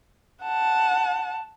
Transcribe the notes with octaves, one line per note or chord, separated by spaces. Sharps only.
F#5 A5